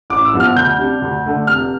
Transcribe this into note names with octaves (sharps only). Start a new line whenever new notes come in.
A1 D6
E6
G2 F3 B3 D4
F6
D2 G6
C3 G3 D4
D2
D3 A3 D4
F1 F6